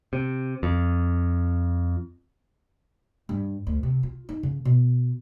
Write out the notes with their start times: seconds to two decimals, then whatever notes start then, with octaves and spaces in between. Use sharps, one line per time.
0.13 C3
0.63 F2
3.29 G2
3.67 D2
3.83 C3
4.03 F4
4.29 D#4
4.43 C#3
4.65 B2